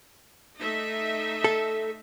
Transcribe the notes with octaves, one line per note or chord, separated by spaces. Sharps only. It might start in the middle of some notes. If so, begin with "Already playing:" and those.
A3 D#4 E5
A4